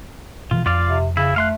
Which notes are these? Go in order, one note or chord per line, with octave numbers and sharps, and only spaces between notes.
B2 E3 F3 F4
F2 F4 D5 F5
C3
C#3 E4
A3 F5 C6 F#6